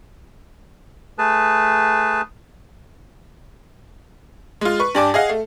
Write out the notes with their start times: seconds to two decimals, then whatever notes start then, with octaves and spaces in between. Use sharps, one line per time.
1.18 A3 G#4 B4 A5
4.61 G#3 F4
4.79 B4 C#6
4.95 G2 G4 D5 G#5 A5 D6
5.14 G#4 D#5 F5 F#5
5.29 A3